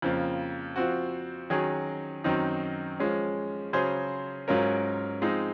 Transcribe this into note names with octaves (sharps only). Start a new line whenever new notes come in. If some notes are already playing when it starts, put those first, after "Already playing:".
F2 C#3 F3 A#3
F3 C4 F#4
D#3 F#3 C#4 G#4
F#2 D#3 F#3 C4 D#4
F3 G#3 C#4
C#3 F#3 C#4 G#4 C5
G#2 F#3 C#4 F4 A#4
F3 G#3 C4 D#4